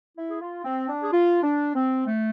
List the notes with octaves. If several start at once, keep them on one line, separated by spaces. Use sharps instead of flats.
E4
G#4
F4
C4
D4
G#4
F4
D4
C4
A3